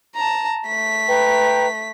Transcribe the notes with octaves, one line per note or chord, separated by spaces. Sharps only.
A5 A#5
A3 B6
B4 G5 A#5